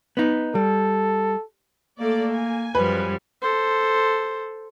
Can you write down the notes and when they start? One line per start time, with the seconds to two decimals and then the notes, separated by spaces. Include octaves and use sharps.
0.17 B3 D#4
0.55 G3 A4
1.99 A3 A#3 A4 D5
2.34 G#5
2.75 F#2 F3 G3 B4
3.42 A4 C5